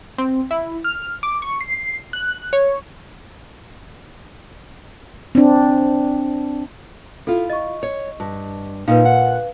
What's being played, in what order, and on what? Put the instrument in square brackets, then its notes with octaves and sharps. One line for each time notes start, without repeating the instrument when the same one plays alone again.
[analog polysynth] C4
E4
F6
D6
C#6
C7
F#6
C#5
[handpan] C4 D4
[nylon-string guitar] E4 F4 [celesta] A4
[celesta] D#5 C#6
[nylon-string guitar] C#5
G2
[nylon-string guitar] A#2 [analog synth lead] D#4 [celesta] B4 F5
[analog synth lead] F#5